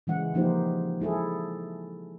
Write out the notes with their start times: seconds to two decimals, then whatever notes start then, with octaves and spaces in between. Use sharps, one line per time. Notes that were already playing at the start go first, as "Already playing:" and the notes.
0.07 C#3 E3 G#3 F#5
0.34 F3 A#3 D#4 F4 G4 C5
1.00 G#3 E4 G#4 A4